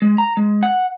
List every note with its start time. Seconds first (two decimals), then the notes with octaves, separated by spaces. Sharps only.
0.02 G#3
0.18 A#5
0.37 G#3
0.63 F#5